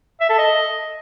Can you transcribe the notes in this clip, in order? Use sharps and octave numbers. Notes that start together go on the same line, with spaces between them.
E5
A4
D#5